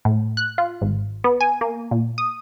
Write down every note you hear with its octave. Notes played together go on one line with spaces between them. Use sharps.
A2
F#6
F4
G#1
B3
G#5
A#3
A#2
D#6